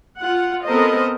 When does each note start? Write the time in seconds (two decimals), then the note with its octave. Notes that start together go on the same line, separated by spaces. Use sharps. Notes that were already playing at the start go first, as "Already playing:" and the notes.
0.20 F4 F#5
0.66 B3 C4 A4 A#4 C5 D#5